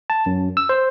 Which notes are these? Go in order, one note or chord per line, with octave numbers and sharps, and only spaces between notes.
A5
F#2
E6
C5